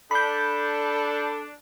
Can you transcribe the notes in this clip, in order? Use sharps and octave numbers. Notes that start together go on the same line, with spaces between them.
D4 A4 B5 G6